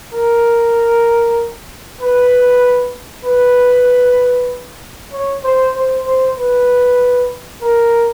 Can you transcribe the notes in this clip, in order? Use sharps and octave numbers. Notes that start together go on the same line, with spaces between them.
A#4
B4
B4
C#5
C5
C5
C5
B4
A#4